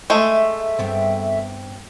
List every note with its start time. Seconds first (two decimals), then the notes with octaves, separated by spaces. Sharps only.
0.10 G#3 A3 E5
0.79 G2 B3 C4